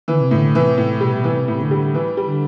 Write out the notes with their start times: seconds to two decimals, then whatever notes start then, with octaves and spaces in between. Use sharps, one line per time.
0.08 D3 E3
0.21 C3
0.31 A2 D3
0.54 C3 E3
0.78 A2
1.01 B2 G3
1.24 E3
1.32 C3
1.48 A2 C3
1.63 D3
1.71 G3
1.94 E3
2.17 G3
2.25 D3